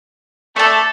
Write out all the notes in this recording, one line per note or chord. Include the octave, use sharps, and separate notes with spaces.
A3 A4 D5 A5